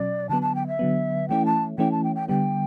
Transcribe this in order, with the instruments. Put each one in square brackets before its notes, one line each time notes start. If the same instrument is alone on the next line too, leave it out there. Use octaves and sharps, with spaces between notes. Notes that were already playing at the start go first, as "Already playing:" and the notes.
Already playing: [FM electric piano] B2 F#3 C#4 [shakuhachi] D5
[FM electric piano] D3 F#3 B3 [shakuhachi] A5
[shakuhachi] A5
G5
E5
[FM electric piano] D3 F#3 B3
[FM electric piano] E3 A3 C#4 E4 [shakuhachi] G5
[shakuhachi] A5
[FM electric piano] E3 A3 C#4 E4 [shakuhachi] G5
[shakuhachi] A5
G5
G5
[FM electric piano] D3 G3 B3 [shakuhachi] G5